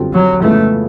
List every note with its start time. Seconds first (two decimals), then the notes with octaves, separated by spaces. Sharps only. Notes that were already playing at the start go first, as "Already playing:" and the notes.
Already playing: F#2 D3 G3 C4 F4
0.13 F#3
0.42 F2 C#3 E3 G#3 A3 B3